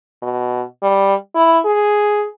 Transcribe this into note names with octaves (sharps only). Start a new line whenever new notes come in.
B2
G3
E4
G#4